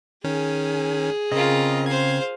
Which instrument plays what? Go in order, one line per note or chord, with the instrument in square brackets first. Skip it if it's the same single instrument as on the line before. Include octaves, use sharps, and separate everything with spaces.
[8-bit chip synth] D#3 C#4 [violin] G#4
[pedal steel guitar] C#3 C4 [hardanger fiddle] F4 A#4 [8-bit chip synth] D#5
[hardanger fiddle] C5 F5 [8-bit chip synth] G#6